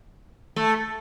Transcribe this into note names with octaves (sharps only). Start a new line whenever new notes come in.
A3